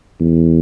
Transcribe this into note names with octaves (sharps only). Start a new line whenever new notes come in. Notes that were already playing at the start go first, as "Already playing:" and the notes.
E2